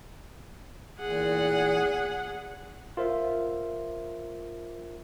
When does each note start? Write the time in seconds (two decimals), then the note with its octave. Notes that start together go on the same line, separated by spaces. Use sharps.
1.00 E2 A#2 G#4 F#5
2.97 F4 A#4 C5 E5